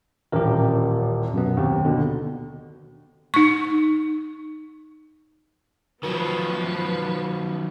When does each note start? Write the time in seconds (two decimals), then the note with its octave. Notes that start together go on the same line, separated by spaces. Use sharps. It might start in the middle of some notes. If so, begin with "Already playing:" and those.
0.32 D#1 A1 G4 A#4
1.33 F#2 B2 B3
1.57 D#2 C4 G4
1.85 B2 D3
3.34 D#4 C#6
6.03 D#3 F3 F#3 B3 B4